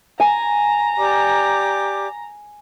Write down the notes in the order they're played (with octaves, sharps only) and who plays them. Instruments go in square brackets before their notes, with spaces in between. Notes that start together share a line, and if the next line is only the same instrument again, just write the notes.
[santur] G#5 [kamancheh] A#5
[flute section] G4 D5 D6